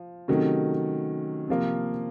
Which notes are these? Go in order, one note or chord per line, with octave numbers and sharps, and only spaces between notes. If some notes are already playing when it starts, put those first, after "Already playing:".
Already playing: F3
C3 D#3 F#3 A3 C#4
C3 F3 A#3